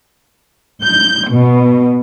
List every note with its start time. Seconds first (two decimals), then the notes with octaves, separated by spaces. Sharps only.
0.82 G6
1.30 B2